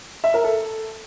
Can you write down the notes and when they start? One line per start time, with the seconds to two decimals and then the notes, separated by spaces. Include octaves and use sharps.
0.24 E5
0.34 A#4
0.44 A4